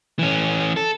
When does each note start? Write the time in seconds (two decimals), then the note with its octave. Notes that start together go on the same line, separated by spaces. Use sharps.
0.19 E3 C#4
0.77 A4